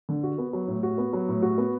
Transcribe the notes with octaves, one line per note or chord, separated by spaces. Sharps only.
D3
F#4
B3
F#3
A2
F#4
B3
F#3
A2
F#4
B3